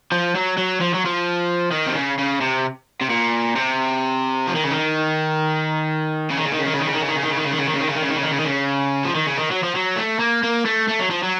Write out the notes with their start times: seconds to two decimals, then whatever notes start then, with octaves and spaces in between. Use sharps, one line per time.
0.12 F3
0.35 F#3
0.57 F#3
0.80 F3
0.94 F#3
1.05 F3
1.72 D#3
1.87 C3
1.96 C#3
2.19 C#3
2.41 C3
3.01 C3
3.10 A#2
3.56 C3
4.47 F3
4.55 D#3
4.64 C#3
4.71 D#3
6.30 C#3
6.37 D#3
6.45 C#3
6.52 D#3
6.59 C#3
6.66 D#3
6.74 C#3
6.80 D#3
6.87 C#3
6.94 D#3
7.02 C#3
7.08 D#3
7.16 C#3
7.23 D#3
7.30 C#3
7.37 D#3
7.45 C#3
7.52 D#3
7.59 C#3
7.67 D#3
7.73 C#3
7.81 D#3
7.88 C#3
7.95 D#3
8.02 C#3
8.09 D#3
8.16 C#3
8.23 D#3
8.31 C#3
8.38 D#3
8.45 C#3
9.05 F3
9.15 D#3
9.27 C#3
9.37 D#3
9.51 F#3
9.63 F3
9.75 F#3
9.96 A3
10.19 A#3
10.43 A#3
10.65 A3
10.88 A3
11.00 F#3
11.11 F3
11.23 F#3